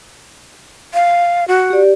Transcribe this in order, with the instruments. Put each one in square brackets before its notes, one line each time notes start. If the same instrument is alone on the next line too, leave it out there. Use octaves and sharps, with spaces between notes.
[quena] F5
F#4
[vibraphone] G4 D5